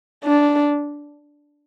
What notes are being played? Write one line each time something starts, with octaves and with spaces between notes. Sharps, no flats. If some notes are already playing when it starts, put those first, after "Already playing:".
D4